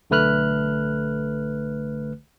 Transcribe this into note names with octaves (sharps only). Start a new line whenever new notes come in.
B1 D3 A3 B4 F6 F#6